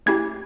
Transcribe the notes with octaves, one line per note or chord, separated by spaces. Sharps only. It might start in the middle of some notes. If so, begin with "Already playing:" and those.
A3 C#4 E4 G4 G#6